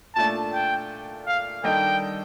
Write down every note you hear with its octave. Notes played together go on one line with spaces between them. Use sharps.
A#2 A3 D4 A5
G5
F5
D#3 G3 D4 A4 D#5 G5